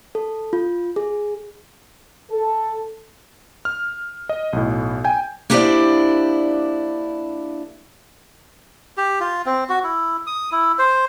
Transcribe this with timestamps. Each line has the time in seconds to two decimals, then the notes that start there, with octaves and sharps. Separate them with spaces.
0.15 A4
0.53 F4
0.96 G#4
2.31 A4
3.65 F6
4.29 D#5
4.53 B1 A2
5.04 G5 G#5 G6
5.50 A#3 D4 E4 G4 C5 D5
8.97 G4
9.20 F4
9.46 C4
9.69 F#4
9.84 E4
10.27 D#6
10.52 E4
10.79 C5